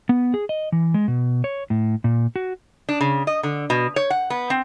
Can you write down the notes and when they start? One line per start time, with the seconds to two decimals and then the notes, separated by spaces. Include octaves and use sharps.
0.09 B3
0.34 G#4
0.49 D#5
0.72 E3
0.94 G#3
1.08 B2
1.44 C#5
1.70 A2
2.04 A#2
2.36 F#4
2.89 D4
3.01 C#3
3.27 D#5
3.43 D3
3.70 B2
3.96 C#5
4.10 F#5
4.30 B3
4.50 C4